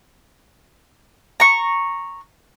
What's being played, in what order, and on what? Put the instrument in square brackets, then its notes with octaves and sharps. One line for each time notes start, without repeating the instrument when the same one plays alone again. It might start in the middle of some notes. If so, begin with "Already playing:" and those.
[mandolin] A#5 C#6